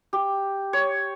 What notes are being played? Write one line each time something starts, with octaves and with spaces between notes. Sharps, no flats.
G4
C#5